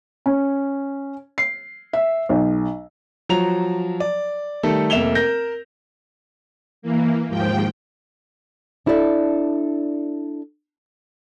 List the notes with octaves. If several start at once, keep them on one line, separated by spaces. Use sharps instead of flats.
C#4
C7
E5
B1
F3 F#3 A#5 F7
D5
D#3 G3 A3 A4
F1 A#3 E5 E7 F7 G7
A#4 G6 A#6
E3 A#3
D#2 G#2 F3 G5
D4 E4 A4 A#4 D5 E5